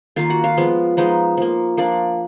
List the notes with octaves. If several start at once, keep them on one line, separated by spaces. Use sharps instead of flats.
D#3 A#3 F4 F5
F#4 F#5
F4 F5
F3 G#3 B3
F3 G#3 B3 D#4 D#5
F3 A#3
F3 A#3 D4 D5